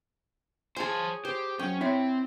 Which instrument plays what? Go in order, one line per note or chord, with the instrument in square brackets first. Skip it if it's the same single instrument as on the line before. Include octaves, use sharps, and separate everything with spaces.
[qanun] G#4 C#5 G#5 [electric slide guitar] C5 A5
[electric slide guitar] G4 [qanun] C5
[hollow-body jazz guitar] F#2 [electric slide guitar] C#4 [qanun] G5
[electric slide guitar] C4 [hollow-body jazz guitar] E4 C#5